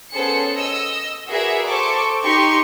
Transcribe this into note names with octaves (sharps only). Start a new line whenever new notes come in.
B3 C#4 G#4 A4 C5 C#7
D#5 E6
F#4 G#4 A#4 B4 D5 E5
A4 C5 C#6 D6
D#4 G4 C6 C#6